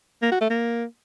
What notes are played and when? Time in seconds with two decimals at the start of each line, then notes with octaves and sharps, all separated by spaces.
0.22 A#3
0.31 F#4
0.41 A3
0.50 A#3